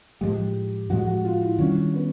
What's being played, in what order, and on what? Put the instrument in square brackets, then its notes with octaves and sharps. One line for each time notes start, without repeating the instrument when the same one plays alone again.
[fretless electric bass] A2 F3 G#3 [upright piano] G4
[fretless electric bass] A2 F3 G#3 [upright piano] F#4
[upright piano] F#4
F4
E4
[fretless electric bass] D#3 G3 A#3 D4 [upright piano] C#4
[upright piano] B3